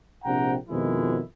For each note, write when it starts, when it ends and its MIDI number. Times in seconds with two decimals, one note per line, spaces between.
0.24 0.54 34
0.24 0.54 48
0.24 0.54 62
0.24 0.54 78
0.24 0.54 79
0.24 0.54 82
0.69 1.19 41
0.69 1.19 47
0.69 1.19 51
0.69 1.19 53
0.69 1.19 56
0.69 1.19 64